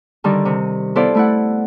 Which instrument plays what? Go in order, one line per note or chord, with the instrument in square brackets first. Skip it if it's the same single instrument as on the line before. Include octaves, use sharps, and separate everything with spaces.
[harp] D3 D#3 G3 D#4
C3
B3 E4 A4 C5 D5 F5
A3 E4 F#5